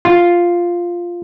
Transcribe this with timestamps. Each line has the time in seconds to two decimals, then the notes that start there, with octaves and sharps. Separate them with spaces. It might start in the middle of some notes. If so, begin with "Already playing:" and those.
0.05 F4